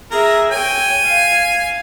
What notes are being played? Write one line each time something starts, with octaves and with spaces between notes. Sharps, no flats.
G#4 A#4 E5
C#5 G5 G#5
F5